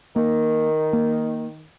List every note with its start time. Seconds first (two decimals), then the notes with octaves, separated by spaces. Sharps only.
0.16 D#3 A#3
0.93 A#3